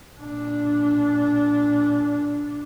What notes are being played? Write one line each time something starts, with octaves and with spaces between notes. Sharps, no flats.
A#2 D4